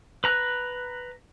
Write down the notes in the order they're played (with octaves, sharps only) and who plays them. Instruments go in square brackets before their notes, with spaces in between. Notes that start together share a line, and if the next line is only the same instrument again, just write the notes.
[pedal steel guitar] B4 A#5 F#6